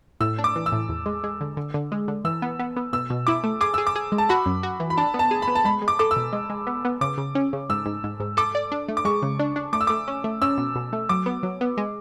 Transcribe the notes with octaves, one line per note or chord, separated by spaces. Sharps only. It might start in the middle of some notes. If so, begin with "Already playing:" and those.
A2 E6
D4
D6
E3
E6
A2
E2
G#3
G#3
D3
D3
D3
G#3
D3
E3 E6
B3
B3
B3
B2 E6
B2
E4 D6
A3
G#4 D6
G#4 E6
D6
G#4
G#3
A5
F#4 B5
F#2
F#4
E3
B5
D4 A5
B3
A5
G#4
B5
B3
A5
G#3 B5
G#3
D6
A4 D6
E6
B2
G#3
G#3
B3
B3
C#3 D6
C#3
C#4
C#3
G#2 E6
G#2
G#2
G#2
A4 D6
D5
D4
A3
D6
G#3 C#6
C#3
D4
D4
A3 D6
E6
A3 D6
C#4
A3
C#4 E6
B2
B2
A3
F#3 D6
B3
F#3
B3
G#3